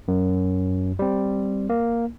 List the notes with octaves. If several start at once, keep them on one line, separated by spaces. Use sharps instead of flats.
F#2
G3 C4
A#3